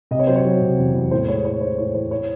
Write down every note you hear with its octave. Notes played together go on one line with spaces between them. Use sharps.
C3 D#5
C#5
F#3 C5
C#5
F#3
C3
E2
E2
A2 C5
G#3 C#5
A2 C#5
A2 C5
A2 C#5
E3 C5
C#5